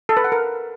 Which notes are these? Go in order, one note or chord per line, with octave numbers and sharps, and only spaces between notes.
A4
B4
F#5
A#4